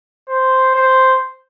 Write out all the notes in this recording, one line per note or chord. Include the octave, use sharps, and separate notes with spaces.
C5
C5